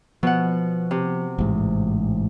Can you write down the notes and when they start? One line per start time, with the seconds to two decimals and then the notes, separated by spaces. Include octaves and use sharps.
0.23 B2 F3 F#5
0.91 C3
1.39 A1 G#2